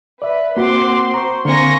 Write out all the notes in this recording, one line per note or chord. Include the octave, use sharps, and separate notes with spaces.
B4 D5 E5
A#3 C4 F#4 F#5 C6 D6
C5 A#5 C#6
D3 A#3 C4 G#5 C6 C#6 A#6